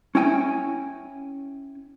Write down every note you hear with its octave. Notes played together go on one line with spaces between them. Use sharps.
C#4 E4 G5 G#5